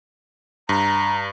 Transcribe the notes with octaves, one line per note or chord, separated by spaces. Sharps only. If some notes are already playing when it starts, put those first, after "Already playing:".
G2 A#5